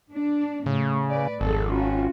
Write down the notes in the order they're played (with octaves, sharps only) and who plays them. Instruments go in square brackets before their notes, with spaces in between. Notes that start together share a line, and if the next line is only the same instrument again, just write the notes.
[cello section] D4
[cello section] A2 [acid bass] C#3
[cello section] B4 D5
[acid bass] G#1 [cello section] F2 G#4 A4
[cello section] C#4 F4 F#4